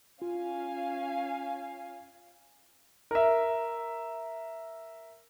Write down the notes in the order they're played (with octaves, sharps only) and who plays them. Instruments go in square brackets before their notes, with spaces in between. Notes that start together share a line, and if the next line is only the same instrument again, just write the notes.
[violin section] C#4 F5 G#5 [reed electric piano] F4
[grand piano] A#4 E5